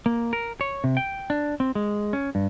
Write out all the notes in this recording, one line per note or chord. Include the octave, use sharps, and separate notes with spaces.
A#3
A#4
C#5
C3
G5
D4
C4
G#3
C#4
G2